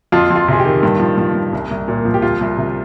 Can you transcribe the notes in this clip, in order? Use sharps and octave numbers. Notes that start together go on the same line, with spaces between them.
F2 F4
F2
F4
C3 G#4
G4
D#3
G2
F3
F3
G2
C2
C2
A#2
F3
G4
C2 F4
C2
C3